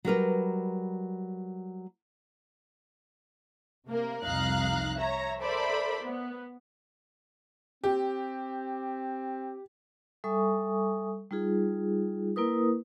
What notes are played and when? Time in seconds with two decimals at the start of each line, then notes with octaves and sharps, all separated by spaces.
0.05 F#3 G3 A#4 B4
3.87 C3 A#3 A#4
4.23 C2 F2 D#4 F5 A#5 F#6
4.97 C#5 E5 A#5
5.40 A4 A#4 C5 D5 E5 B5
6.03 B3
7.84 C4 G4
10.24 G3 A4 E5 G#5 C#6 D#6
11.31 G3 D#4 F4 G#4
12.36 A#3 E4 A#4 B4 D#6